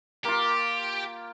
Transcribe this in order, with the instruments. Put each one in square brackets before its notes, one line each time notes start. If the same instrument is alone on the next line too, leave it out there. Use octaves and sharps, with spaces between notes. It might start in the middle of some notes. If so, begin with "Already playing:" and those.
[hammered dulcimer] A#3 F4 [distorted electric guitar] G4